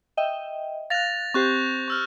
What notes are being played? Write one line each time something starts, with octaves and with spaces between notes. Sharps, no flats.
D#5 E5 G5
F5 F#6 A6 A#6 F7
C4 G4 C5 C#6 F#6 G6
C#6 E6 F6